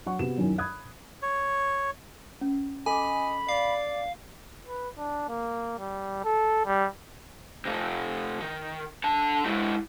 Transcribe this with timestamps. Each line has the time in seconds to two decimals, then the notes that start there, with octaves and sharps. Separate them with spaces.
0.06 F#3 F#5 C#6
0.19 C3 B3 F#4 E7
0.38 F#2 D#3 F#3 C#4 E4 F#4
0.58 B5 D#6 F#6 G#6
1.22 C#5
2.41 C#4
2.86 A4 D#5 G#5 B5 D6
3.49 D5 F5
4.67 B4
4.97 D4
5.29 A#3
5.79 G3
6.24 A4
6.66 G3
7.65 C3 F3
8.41 D#3
9.04 D3 A5
9.46 G#3 E4